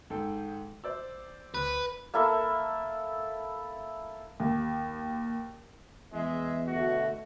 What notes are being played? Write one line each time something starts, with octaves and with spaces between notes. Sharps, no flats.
G#1 G#2 A4 G5
C5 D5 E6
D2 B4
A#3 E4 A4 E5
D#2
E2 G#3 E5
B2 D3 A3 F#4